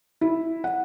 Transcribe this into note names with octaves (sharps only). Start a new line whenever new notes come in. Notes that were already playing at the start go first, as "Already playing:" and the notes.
E4
F#5